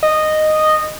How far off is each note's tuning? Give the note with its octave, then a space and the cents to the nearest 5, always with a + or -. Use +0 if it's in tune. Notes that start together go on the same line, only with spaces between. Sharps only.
D#5 -10